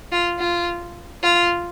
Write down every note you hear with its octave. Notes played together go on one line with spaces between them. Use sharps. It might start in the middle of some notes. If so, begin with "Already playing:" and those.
F4
F4
F4